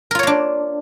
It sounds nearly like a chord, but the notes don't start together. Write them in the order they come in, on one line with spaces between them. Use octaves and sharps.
A#4 F4 C#5 A#3 D4